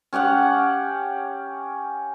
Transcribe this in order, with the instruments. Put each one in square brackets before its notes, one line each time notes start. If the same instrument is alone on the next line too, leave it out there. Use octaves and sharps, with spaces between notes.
[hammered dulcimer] C#4 G4 F5 F#5